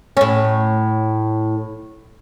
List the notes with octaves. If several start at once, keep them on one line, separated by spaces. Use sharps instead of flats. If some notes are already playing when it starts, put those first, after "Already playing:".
A2 C#4